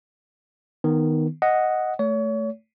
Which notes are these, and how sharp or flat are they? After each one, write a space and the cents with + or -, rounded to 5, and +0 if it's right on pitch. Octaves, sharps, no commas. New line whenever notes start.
D#3 +0 B3 +0
D#5 +0 F#5 +0
A3 +0 C#5 +35